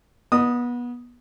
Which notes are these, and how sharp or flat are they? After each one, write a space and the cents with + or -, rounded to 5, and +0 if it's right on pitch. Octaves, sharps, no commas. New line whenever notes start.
B3 -25 D#5 -35 D#6 +0